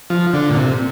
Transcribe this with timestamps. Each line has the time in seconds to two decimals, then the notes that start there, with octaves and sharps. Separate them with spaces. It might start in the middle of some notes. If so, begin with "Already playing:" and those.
0.10 F3
0.33 D3
0.50 A#2
0.56 C3